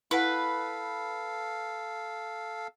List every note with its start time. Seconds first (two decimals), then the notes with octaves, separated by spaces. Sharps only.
0.11 E4 A4 B4 F5 F#5